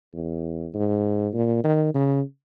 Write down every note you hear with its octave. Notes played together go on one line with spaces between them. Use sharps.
E2
G#2
A#2
D#3
C#3